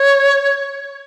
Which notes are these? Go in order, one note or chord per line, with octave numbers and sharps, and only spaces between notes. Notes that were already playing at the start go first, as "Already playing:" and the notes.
Already playing: C#5